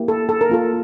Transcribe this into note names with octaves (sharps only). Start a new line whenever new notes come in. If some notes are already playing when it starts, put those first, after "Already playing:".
Already playing: A#3 E4 G4
A4
A4
A#4
A#3 F4 A4